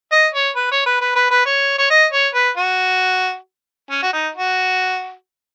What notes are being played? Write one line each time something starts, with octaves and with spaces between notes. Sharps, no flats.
D#5
C#5
B4
C#5
B4
B4
B4
B4
C#5
C#5
D#5
C#5
B4
F#4
C#4
F#4
D#4
F#4